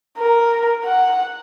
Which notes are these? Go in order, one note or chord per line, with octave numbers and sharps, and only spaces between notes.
A#4
F#5